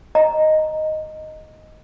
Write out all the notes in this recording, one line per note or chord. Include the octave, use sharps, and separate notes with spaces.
D#5 A#5